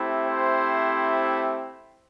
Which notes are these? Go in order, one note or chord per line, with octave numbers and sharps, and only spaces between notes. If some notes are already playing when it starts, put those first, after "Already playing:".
Already playing: A3 C4 E4 G4
C5